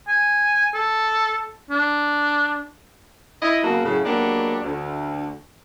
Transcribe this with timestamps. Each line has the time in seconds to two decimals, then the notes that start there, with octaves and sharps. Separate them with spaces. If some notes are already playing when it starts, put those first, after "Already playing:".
0.08 G#5
0.74 A4
1.71 D4
3.42 E4 D#5
3.63 C#3 F#3 A#3 B3 F#4 A4
3.84 F#2 A2 C#3
4.05 F#3 G#3 A#3 B3 D4 G4
4.63 D2